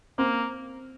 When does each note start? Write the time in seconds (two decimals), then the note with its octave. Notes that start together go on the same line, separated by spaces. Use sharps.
0.18 A#3 C4